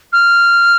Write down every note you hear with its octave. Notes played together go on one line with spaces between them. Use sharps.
F6